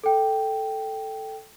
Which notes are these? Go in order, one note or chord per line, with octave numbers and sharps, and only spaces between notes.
A4 G5